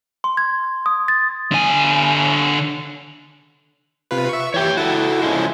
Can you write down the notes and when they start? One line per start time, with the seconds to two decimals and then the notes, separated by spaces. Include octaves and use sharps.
0.24 C6
0.37 G#6
0.86 D#6
1.08 A6
1.52 D3 G#5
4.11 C3 F4 B4
4.29 E5 C#6
4.54 E3 G4 C#5 G5
4.77 E4 F#4 A4
5.22 C#3 F3 G#3